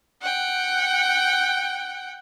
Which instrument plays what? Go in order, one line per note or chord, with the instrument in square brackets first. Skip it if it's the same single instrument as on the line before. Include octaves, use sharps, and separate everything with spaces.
[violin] F#5 G5